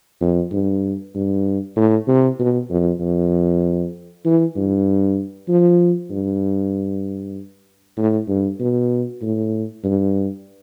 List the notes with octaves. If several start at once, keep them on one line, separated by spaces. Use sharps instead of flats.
F2
G2
G2
A2
C3
B2
F2
F2
E3
G2
F3
G2
A2
G2
B2
A2
G2